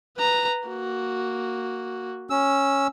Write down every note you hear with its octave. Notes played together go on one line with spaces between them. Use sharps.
B4 A#5
A#3 F#4
C#4 E6